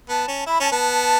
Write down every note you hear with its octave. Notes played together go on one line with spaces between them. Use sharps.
B3 A5
C#4
E4 B5
C#4 A5
B3 A5